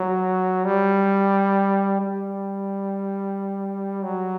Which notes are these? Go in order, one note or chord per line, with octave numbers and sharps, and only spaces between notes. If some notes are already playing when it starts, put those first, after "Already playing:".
Already playing: F#3
G3
G3
F#3